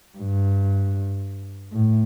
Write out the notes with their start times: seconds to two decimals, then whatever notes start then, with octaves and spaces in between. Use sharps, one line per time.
0.18 G2
1.73 A2